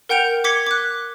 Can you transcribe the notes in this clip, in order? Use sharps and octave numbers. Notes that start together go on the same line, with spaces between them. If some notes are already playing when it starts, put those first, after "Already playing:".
A#4 F#5 G5 G6 D7 F7
D6 G#6 B6 C#7 G7
D6 F#6